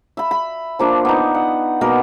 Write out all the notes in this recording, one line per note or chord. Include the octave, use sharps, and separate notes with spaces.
E5 B5
B5
F3 A#3 D4
B3 D#4
F#5
B2 A#3 B3 A#4